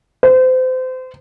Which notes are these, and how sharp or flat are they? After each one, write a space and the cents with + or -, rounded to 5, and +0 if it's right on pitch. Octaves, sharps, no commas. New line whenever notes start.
C5 -30